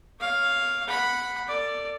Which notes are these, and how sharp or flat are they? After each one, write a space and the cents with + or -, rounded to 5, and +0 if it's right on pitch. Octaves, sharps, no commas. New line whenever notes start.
C#5 +0 F5 +0
F#5 -10 B5 +0
A4 +40 D5 +0